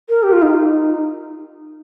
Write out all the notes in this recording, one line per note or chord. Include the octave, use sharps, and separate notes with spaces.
A#4
G4
F4
D#4